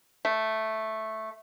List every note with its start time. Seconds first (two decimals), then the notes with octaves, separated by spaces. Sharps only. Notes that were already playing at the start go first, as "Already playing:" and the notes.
0.25 A3